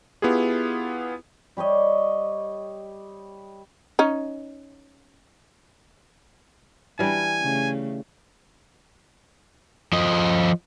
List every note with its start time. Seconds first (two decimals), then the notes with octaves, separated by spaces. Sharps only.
0.22 B3 E4 F4 G4 G#4
1.57 G3 G4 C#5 D#5
3.99 C#4 D#4
6.99 E3 G3 D4 G#5
7.42 C#3 A3
9.93 F3 D#5